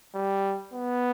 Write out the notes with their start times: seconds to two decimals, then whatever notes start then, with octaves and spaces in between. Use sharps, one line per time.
0.15 G3
0.73 B3